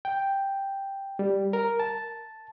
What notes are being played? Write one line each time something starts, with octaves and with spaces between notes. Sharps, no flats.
G5
G3
A#4
A5